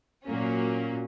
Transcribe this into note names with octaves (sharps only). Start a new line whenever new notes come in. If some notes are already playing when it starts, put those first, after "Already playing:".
A#2 F#3 A#3 C#4